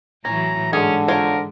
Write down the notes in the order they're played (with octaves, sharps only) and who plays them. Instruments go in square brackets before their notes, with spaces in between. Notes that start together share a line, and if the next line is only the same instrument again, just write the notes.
[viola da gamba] A2 E3 F#3 [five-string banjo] C#4 [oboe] A#5
[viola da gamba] G#2 [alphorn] D3 [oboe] C#4 [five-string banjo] G#4
[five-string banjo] F3 F4 C#5 [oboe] A#4